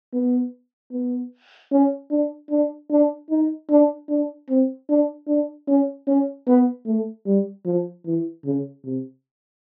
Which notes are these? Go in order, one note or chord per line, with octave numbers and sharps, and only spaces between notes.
B3
B3
C#4
D4
D4
D4
D#4
D4
D4
C4
D4
D4
C#4
C#4
B3
A3
G3
F3
E3
C#3
C3